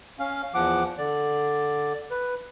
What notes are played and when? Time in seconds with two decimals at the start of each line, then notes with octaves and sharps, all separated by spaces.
0.19 C#4 F5
0.54 E2 F3 F#5 D6
0.98 D3 D5
2.11 B4